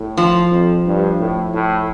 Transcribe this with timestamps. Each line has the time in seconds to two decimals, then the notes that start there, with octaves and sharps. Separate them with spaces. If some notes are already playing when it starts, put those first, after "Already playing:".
Already playing: A2
0.17 F3
0.52 F2
0.85 G2
1.20 A2
1.54 A2